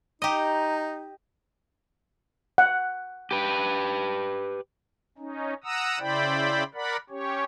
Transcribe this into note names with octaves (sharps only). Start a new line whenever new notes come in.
D#4 G4 D#5 A#5
F#5
G4 B4
C#4 D#4
F#5 A#5 D#6 E6
C#3 E4 C5 D5 G5 B5
A#4 D5 F#5 B5
C#4 G4 C#5